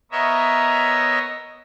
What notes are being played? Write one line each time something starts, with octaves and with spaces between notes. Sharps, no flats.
B3 A#4 C#5 D#5 E5 A#5